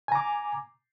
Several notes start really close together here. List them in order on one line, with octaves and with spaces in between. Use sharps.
G#5 A#5 D6